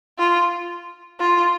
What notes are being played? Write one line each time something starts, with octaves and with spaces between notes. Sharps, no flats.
F4
F4